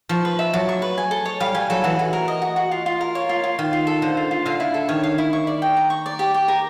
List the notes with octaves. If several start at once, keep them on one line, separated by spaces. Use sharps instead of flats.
F3 C#6
B4
E5
F#3 A5
C#6
B4
G#5
A4
C#5
G3 F5
G3 G#5
F#3 A4
E3 F#4
F#4
A#4
D#5
F#4
F#4
F4
F4
A#4
C#5
F4
F4
D#3 F4
F4
A4
D3 C5
F4
F4
D3 F5
E4
A4
D#3 C#5
F5
E4
C#6
D5
G5
A#5
C#6
D5
G4
G4
A#4